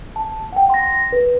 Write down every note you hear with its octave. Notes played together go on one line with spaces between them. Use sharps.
A5
F#5 G5
C6 A#6
B4